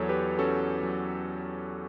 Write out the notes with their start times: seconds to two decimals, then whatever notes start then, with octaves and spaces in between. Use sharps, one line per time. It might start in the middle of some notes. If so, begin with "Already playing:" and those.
Already playing: E2 F#3 A4 C#5
0.09 G4 B4
0.38 C#4 F#4 A4
0.83 F#3